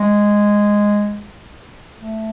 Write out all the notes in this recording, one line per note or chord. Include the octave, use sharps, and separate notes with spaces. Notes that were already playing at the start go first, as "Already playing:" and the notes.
Already playing: G#3
A3